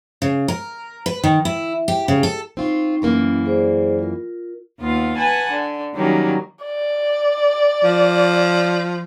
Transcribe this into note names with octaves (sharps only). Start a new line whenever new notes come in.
C#3
A#4
B4
D#3
E4
G4
C#3
A4
C4 D#4 F4 C#6
F#2 E3 A#3 C#4
G#4 C5 D5
F4 A#4
D#2 B3 F4 F5
B4 F#5 G#5 A5
D3
D#3 F#3 G3 A#3 C#4
D5
F3